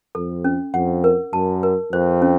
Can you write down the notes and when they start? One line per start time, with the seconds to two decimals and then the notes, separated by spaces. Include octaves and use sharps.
0.15 F2 A4
0.44 C#4
0.74 F2 F#5
1.04 A#4
1.33 F#2 A5
1.63 A#4
1.92 F2 C5
2.22 C#4